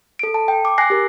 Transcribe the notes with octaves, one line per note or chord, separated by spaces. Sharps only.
A4 D7
A5
G5
D6
G#5 F#6 A#6 C7
G4 A#4